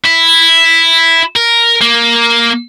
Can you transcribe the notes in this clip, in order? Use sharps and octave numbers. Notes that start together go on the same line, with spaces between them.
E4
A#4
A#3